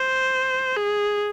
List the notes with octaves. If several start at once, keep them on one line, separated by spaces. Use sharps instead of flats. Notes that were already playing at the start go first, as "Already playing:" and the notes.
Already playing: C5
G#4